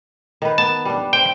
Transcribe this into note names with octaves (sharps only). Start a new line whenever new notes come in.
D#3 B4
B3 A5
G3 D4
C5 G5